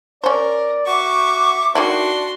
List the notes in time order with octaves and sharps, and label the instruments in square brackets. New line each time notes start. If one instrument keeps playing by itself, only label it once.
[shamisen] C#4 C5 [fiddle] A#4 [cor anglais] D5
[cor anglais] F#4 [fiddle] E5 C#6 [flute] D6
[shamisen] D#3 A3 E4 [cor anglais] D4 [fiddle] F#4 C6